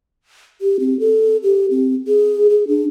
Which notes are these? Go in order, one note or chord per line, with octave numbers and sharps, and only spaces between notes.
G4
C4
A4
G4
C4
G#4
G#4
D4